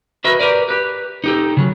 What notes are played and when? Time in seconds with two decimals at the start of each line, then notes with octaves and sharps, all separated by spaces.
0.24 F#4 A#4 B4 D#5 E5
0.40 G4 A#4 B4 D5
0.69 G4 B4
1.24 D#4 G4 A4
1.57 C#3 F#3